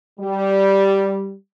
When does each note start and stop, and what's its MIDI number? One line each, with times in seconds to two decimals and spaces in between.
0.20 1.34 55